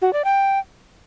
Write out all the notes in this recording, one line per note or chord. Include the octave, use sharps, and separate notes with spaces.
F#4
D5
G5